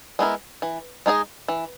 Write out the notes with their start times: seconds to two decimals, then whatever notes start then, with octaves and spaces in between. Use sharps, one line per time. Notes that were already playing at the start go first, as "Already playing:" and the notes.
0.19 G#3 B3 E4 A#4
0.62 E3
1.06 G#3 D#4 G#4 D#5
1.48 E3